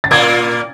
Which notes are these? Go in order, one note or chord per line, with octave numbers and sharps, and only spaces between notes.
A6
A#2 A#3 G#6